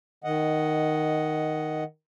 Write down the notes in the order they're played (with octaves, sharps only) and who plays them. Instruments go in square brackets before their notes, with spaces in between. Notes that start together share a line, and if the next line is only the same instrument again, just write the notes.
[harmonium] D#3 D#5 F#5